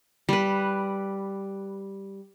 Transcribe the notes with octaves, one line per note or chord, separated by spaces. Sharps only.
G3 B4